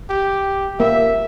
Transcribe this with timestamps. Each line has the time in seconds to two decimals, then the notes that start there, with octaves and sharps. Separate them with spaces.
0.10 G4
0.80 A#3 E5